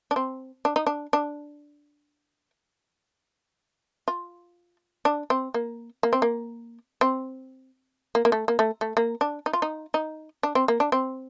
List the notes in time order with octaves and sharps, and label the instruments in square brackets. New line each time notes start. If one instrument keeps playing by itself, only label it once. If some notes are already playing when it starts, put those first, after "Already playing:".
[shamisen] D4
C4
D4
D#4
D4
D4
F4
D4
C4
A#3
A#3
C4
A#3
C4
A#3
A#3
A3
A#3
A3
A3
A#3
D4
D#4
F4
D#4
D#4
D4
C4
A#3
D4
C4